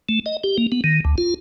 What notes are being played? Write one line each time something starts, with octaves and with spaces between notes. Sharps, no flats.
A3
D#5
G4
A#3
B3
D#3
D2
F4